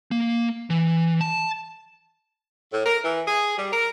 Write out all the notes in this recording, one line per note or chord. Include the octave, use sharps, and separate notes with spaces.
A#3
E3
A5
A2
A#4
E3
G#4
G3
A#4